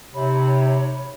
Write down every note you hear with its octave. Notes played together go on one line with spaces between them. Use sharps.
C3 D#4 C#5 B5